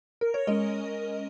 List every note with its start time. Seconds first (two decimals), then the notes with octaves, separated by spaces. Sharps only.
0.21 A#4
0.34 C#5
0.47 G#3 C#4 A#4 D#5